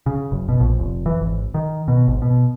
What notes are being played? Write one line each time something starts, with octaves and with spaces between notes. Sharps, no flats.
C#3
F#1
B2
A#1
F1
E3
G#1
D#3
B2
G#1
B2